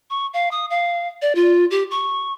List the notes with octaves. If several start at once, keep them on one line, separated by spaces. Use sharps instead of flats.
C#6
F5
D#6
F5
D5
F4
G4
C#6